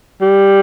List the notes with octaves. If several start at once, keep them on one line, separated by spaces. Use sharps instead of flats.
G3